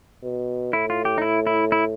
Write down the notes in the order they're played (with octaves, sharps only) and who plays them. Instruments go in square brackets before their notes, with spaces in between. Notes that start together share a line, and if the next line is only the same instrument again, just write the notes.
[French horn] B2
[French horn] A2 [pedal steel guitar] E4
[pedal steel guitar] F4
G4
D#4
E4
E4
E4